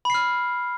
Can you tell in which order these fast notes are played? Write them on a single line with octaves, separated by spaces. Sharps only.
B5 C7 F6